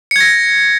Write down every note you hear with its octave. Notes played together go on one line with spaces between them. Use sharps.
G#6 A#6 C#7